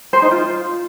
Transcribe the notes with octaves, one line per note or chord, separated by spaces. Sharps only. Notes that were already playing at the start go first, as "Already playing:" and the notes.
C5
D#4
F4